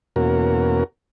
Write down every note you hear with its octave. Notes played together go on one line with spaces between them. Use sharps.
E2 B2 A#3 C#4 F#4 A#4